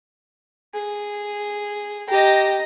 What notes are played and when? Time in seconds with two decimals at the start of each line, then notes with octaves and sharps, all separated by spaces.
0.74 G#4
2.09 G4 D#5 A#5